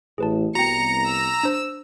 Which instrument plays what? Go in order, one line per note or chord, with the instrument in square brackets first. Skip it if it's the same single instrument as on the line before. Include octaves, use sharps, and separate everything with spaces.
[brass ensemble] A1 [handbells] G#4 B4 A5
[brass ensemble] C2 B3 [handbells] F#4 G5 [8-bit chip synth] A#5 [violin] C#7
[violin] E6
[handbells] D4 C5